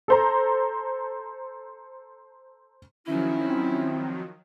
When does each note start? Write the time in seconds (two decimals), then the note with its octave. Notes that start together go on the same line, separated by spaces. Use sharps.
0.08 A4 C5 A#5
3.07 D#3 F3 F#3 C#4 E4
3.44 C4